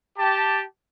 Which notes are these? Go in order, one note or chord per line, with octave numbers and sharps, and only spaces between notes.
G4 A5